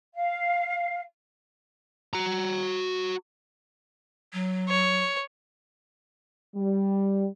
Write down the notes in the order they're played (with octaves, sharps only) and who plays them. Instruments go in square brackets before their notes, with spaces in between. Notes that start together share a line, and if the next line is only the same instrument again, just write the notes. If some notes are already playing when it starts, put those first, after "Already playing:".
[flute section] F5
[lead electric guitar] F#4 A#5
[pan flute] F#3
[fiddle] C#5
[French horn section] G3